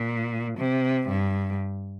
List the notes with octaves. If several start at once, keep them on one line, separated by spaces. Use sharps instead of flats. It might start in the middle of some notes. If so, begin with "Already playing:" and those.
Already playing: A#2
C3
G2